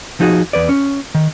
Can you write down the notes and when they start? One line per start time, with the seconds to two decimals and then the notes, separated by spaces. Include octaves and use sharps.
0.20 F3 D#4 F#4 G#4
0.53 E2 B4 D5
0.69 C#4
1.15 D#3